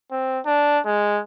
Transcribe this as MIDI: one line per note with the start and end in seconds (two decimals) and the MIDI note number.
0.11 0.40 60
0.46 0.80 62
0.86 1.21 56